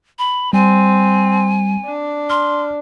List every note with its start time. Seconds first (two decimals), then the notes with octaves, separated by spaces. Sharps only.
0.19 B5
0.53 G3 C4 G#5
1.86 D4
2.30 C6 F6